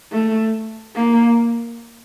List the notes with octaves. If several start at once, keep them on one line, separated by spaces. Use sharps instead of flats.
A3
A#3